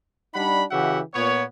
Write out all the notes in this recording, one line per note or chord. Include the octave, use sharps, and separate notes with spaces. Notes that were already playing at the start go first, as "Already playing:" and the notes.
G3 D4 D#4 F#5 B5
C#3 E3 F#4 G4 E5 F#5
A#2 B3 C#5